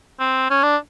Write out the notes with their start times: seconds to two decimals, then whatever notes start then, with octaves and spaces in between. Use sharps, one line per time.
0.20 C4
0.50 C#4
0.63 D4